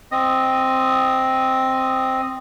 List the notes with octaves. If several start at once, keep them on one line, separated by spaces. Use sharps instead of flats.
C4 D#5 D#6